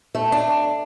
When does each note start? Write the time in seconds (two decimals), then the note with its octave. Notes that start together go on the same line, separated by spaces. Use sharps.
0.15 A3
0.32 D4